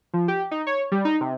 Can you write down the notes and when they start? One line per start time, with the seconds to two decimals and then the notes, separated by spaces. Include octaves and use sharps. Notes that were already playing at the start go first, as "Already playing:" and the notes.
0.14 F3
0.28 G4
0.51 D#4
0.67 C#5
0.92 G3
1.05 D#4
1.21 C3